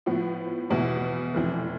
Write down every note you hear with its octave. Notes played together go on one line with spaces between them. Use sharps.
A2 F3 B3
E2 B2 B3 E4
F1 F2 E3